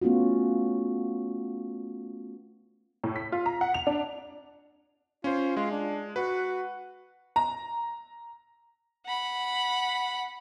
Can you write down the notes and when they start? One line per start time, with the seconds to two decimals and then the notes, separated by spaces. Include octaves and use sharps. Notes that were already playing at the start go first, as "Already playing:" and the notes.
0.02 A3 B3 C#4 F4 F#4
3.04 A2
3.16 B6
3.32 F4
3.46 A#5
3.61 F#5
3.74 F7
3.87 D4
5.24 C#4 F4 C5
5.57 G#3 F4
5.71 D4
6.16 F#4 B4
7.36 A#5
9.06 F#5 B5